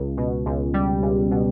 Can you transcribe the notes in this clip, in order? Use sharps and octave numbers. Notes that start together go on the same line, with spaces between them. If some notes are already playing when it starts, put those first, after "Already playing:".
Already playing: C#2
B2
C#2
G3
C#2
B2